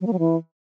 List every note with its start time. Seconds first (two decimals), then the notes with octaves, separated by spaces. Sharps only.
0.01 F#3
0.07 A#3
0.13 F#3
0.19 E3